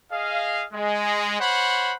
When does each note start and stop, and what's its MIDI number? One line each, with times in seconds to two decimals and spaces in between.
0.12 0.66 68
0.12 0.66 75
0.12 0.66 77
0.73 1.39 56
1.40 1.95 72
1.40 1.95 73
1.40 1.95 78
1.40 1.95 83